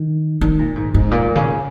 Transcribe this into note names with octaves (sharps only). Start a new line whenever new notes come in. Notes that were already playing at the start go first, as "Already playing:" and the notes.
Already playing: D#3
D#3
A#2
G#2
G#2
A#2
C#3